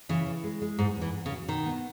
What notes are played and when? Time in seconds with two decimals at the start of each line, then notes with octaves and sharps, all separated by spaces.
0.09 C#3 E3
0.27 E3
0.44 G#3
0.62 G#3
0.79 E2 G#2
0.96 E2
1.02 E3
1.14 E2
1.26 C#3
1.32 F#3
1.48 B2 D#3
1.66 B3